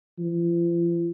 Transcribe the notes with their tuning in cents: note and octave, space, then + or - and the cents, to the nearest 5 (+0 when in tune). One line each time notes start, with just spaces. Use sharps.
F3 -40